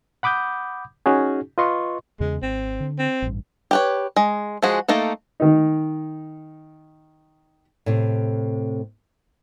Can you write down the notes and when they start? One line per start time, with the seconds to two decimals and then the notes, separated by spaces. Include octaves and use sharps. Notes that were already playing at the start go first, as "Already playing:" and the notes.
0.23 F#5 B5 D6 D#6 G6
1.06 C#4 D#4 F#4 G#4
1.58 F4 B4 D#5 C6 C#6
2.20 E2 C#3 G#3
2.42 G#1 C4
2.80 D3
2.99 C4
3.22 A1 G2
3.71 G4 B4 C#5
4.16 G#3
4.63 F3 G#3 F#4 G#4
4.88 A3 A#3 D#4 A4
5.40 D#3 D#4
7.86 A2 C3